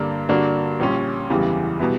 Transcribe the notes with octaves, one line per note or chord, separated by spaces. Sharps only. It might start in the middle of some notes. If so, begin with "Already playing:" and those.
Already playing: G2 D3 A#3 D4
G2 D3 A#3 D4 F#4
A#1 A#2 G3 C#4
F#1 E2 C#3 E3 G3
B2 G3 B3 E4